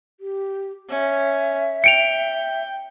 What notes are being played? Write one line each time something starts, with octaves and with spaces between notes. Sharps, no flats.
G4
C#4 E5
G5 C#7 D7 F7